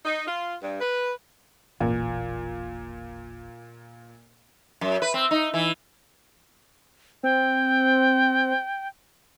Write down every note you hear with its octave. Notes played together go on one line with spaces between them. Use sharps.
D#4
F4
G2
B4
E1 A1 A#2 E3
F#2
B4
C4
D#4
E3
C4 G5